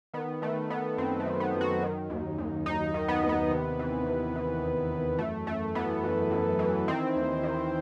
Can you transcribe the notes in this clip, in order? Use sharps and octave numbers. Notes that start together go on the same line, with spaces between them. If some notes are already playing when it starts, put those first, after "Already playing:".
D#3 B3
D#3 A3
D#3 B3
F#2 C4
A3
D#3
B3
F#2
F#4
D#3
D#2
D#2
D#2 D#4
D#3
B3
D#2
B3
C3
E3
C3
E3
E2
E2
F#2 A3
F#2 A3
E3 B3
F#2
F#2
E3
D#3 C4
D#2
D#3